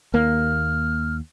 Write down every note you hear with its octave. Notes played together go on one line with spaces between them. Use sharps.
D#2 A#3 F6